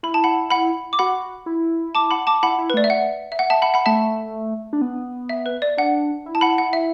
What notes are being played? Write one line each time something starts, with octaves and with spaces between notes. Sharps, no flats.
E4 B5
A5
F#5 B5
F#5 B5
D6
F#4 F#5 B5
E4
A5 D6
F#5 B5
A5 D6
E4 F#5 B5
E4
B4
A3 D5
E5
F#5
E5
F#5
E5 A5
F#5 B5
F#5 B5
A3 E5 A5
D4
B3
E5
B4
D5
D4 F#5
E4
A5
F#5 B5
F#5
E5